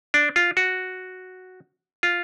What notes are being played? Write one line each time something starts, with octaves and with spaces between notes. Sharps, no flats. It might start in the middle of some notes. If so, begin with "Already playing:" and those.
D4
F4
F#4
F4